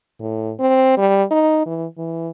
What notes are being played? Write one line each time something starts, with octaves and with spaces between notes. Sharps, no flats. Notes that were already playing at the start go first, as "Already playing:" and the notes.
A2
C4
G3
D#4
E3
E3